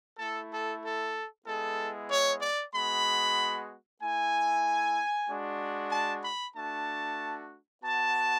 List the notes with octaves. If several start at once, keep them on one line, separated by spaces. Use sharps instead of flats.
A3 E4 A4
A4
A4
G#3 B3 E4 A4
C#5
D5
G#3 B3 F#4 B5
A3 E4 G#5
G#3 D4 F#4
A5
B5
A3 D4 F#4 A5
B3 F#4 A5